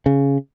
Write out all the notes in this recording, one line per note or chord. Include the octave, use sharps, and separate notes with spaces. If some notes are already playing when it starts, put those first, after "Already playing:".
C#3